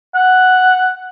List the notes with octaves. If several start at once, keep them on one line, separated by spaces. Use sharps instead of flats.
F#5